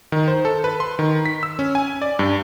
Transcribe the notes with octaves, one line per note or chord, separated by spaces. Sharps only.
D#3
C5
A4
B4
C6
D#3
B6
E6
C#4
G#5
D5
G2